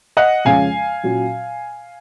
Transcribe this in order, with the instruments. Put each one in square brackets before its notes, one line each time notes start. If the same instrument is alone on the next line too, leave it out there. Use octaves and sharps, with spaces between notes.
[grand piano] D#5 F#5
[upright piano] F2 C#3 G#3 C#4 [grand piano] F5 G#5
[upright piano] A#2 F#3 C#4 F#4